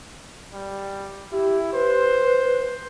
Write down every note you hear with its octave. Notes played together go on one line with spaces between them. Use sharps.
G3
E4 G4
B4 C5